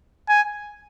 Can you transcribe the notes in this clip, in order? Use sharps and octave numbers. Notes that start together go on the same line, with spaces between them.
G#5